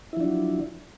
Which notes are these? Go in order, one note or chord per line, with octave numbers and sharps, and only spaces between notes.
F3 F#3 D4 E4